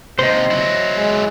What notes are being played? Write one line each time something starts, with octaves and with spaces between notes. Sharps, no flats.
D#2 C3 C5 D#5
F#3 E4
G#3